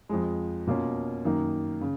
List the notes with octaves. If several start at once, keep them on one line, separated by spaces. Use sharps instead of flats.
F2 F3 G#3
B2 A#3 C#4 F4
F#2 D#3 A#3
C#3